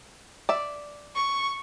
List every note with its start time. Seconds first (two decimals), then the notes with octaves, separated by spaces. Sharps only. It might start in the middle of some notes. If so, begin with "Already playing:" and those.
0.49 D5 E5
1.16 C#6